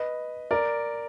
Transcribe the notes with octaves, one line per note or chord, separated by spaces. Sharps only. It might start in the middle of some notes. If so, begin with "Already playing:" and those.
Already playing: B4 D#5
A#4 D5